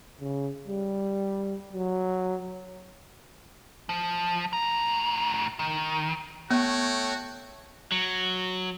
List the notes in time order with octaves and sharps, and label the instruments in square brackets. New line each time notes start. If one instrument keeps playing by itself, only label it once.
[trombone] C#3
G3
F#3
[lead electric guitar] F3
A2 A#5
D#3
[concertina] A3 C#5 G5 [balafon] B3 [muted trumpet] F#4
[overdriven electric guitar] F#3